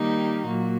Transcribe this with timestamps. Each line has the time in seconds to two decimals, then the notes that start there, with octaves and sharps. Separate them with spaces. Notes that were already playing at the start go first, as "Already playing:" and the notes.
Already playing: D#3 G3 A#3 D#4 G4
0.46 A#2 F#3 A#3 F#4